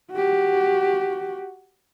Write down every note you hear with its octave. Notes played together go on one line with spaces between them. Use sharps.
F#4 G4